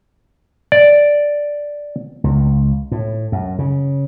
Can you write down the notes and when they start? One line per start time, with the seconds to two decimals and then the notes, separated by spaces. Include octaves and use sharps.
0.72 D5
2.24 C#2
2.92 A2
3.32 F#2
3.59 C#3